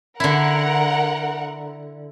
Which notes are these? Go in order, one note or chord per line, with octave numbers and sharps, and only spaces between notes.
D3 E4 A#4 F#5